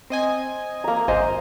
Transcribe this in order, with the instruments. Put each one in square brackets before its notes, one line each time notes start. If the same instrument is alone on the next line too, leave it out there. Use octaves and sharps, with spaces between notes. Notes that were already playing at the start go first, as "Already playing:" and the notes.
[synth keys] C4 D#5 G#5
[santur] A#3 A#5
[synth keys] G#1 [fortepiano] C5 D#5 G#5